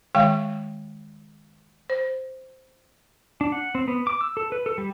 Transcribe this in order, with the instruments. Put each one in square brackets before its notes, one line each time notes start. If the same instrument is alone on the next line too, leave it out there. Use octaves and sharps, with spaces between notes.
[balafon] D#3 G#3 F5 G5
C5
[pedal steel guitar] D4
F#5
C4
B3
D6
E6
A4
B4
A4
G3